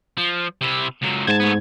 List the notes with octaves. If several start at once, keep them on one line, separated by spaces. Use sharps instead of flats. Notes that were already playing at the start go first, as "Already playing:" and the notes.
F3
C3 E4
C#2 F#3
G#2 C5 A5 G#6
A3 B3